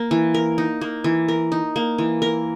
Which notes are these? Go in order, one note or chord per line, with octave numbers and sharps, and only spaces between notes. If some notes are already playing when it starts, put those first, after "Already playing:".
Already playing: A#3
E3
A#4
D#4
A#3
E3
A#4
D#4
A#3
E3
A#4